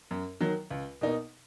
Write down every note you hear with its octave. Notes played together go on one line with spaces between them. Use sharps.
F#2
D#3 F#3
C#2
B2 A#3 D#4